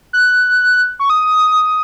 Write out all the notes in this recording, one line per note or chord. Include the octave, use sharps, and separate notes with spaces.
F#6
C#6
D#6